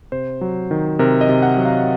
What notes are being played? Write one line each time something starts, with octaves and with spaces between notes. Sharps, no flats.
C3 C5
F#3
D#3
C3 A#4
D#5
C3
F#5
F#3
F5